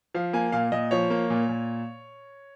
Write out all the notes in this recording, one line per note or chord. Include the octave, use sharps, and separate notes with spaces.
F3 F5
A#3 G#5
A#2 F5
A#2 D#5
F3 C#5
A#3
A#2
A#2